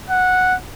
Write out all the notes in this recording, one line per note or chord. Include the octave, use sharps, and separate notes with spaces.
F#5